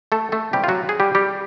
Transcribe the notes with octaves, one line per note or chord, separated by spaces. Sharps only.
A3 A4
A3 A4
C#2 C3 E3 G3 G4
F4
F#3 F#4
G#4
G3 G4
G3 G4